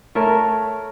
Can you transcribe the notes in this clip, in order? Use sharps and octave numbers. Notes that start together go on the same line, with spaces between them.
A3 A4 A#4 C#5